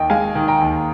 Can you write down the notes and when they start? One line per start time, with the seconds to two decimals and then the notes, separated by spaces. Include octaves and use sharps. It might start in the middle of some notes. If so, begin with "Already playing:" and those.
Already playing: D#2 D#3 D#5 G5
0.10 G#3 F5 G#5
0.35 D#3
0.48 G5 A#5
0.61 D#2